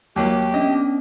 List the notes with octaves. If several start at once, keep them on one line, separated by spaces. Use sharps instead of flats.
D#2 F#3 A#3 G4
B3 C#4 D4 D#5